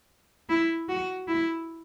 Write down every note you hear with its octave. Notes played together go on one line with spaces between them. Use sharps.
E4
F#4
E4